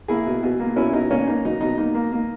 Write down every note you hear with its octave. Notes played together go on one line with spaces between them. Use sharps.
A#3 E4 G#4
B2
B2
A#3
B2 C#4 E4
B2 D#4
A#3 C#4
A#3 D#4
F#3 D#4
B2 D#4
A#3 D#4
A#3
A#3